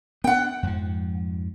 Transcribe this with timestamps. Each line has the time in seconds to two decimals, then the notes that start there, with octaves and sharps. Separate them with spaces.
0.24 B3 D4 F#5 G5
0.63 F2 G#2 F3